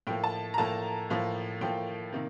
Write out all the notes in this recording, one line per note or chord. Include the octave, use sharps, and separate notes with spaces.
A2 F3 A#3 G5
A5
A#5
A2 F3 A#3 A5
A2 F3 A#3
A2 F3 A#3 G5
C3 D#3 A#3